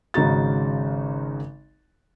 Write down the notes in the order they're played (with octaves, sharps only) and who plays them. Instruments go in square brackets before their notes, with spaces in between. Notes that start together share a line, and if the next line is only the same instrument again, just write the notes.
[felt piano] G#1 C#3 D#4 F#4 A6